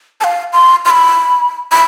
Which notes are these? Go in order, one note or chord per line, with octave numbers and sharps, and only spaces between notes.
A5
F5
C6
C6
B5
B5